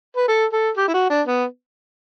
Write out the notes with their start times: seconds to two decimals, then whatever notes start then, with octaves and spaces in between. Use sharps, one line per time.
0.17 B4
0.28 A4
0.52 A4
0.77 G4
0.88 E4
0.94 F#4
1.10 D4
1.27 B3